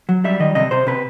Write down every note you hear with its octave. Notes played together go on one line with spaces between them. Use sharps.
F#3
G3 E5
D#3 D#5
C3 D#5
C3 C5
C3 B4